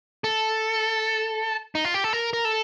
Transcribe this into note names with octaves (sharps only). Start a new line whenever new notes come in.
A4
D#4
F4
G4
A4
A#4
A#4
A4